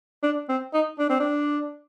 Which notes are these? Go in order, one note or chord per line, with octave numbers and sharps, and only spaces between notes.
D4
C4
D#4
D4
C4
D4